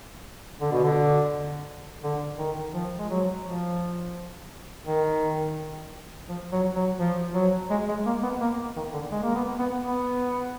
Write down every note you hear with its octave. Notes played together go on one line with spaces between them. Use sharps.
D3
B2
D3
D3
D#3
F3
G#3
F#3
F3
D#3
F3
F#3
F#3
F3
F#3
G#3
G#3
A#3
B3
A#3
D#3
D3
G#3
A#3
B3
B3
B3